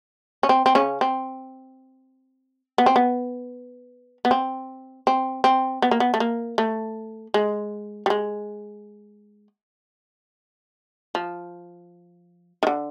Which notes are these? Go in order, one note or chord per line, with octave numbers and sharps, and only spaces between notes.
C#4
C4
C4
C#3 C#4
C4
B3
C4
B3
B3
C4
C4
C4
B3
A#3
B3
A3
A#3
A3
G#3
G3
G#3
F3
D#3
D3